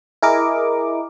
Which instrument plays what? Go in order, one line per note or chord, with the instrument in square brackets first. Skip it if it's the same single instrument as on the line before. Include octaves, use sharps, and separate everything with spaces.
[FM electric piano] E4 G#4 A#4 D#5 D6